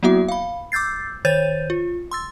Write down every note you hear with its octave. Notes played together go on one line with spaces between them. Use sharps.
F#3 A#3 B3 E4 F#4 E5
F5 B5
D6 E6 G6 A6 C7
D#3 C5 C#5 G6 A6 D#7
F4
C6 E6 A6